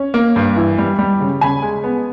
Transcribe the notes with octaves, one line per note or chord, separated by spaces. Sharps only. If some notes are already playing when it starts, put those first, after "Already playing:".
Already playing: C#4
A#3
G2
E3
G3
G3
C#3
C#3 G#5 B5
G#3
B3